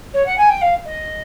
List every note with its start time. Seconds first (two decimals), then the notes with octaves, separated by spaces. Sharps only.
0.14 C#5
0.26 F#5
0.38 G#5
0.50 G5
0.61 F5
0.86 D#5